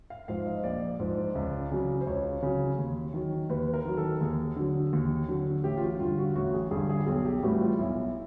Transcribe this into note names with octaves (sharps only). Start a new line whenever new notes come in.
F5
G#2 F3 F5
D#5
A#1 D5
G#2 F3
C#2
C#3 F#3
C5
C#2 C#5
C#3 F#3
D#2
D#3 F#3
D#2 B4
A#4
D#3 F#3
A4
D#2 G#4
D3 F#3
D#2
D3 F#3
A1 G4
F4
F#4
G2 D3 F4
F#4
A1 F#4
G#4
G2 D3 G#4
G#4
G4
B1 G#4
G4
A2 E3 G3 F#4
F4
B1 E4